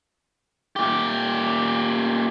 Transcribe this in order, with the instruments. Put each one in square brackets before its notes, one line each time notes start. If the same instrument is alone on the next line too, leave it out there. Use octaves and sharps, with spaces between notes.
[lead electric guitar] A#2 G4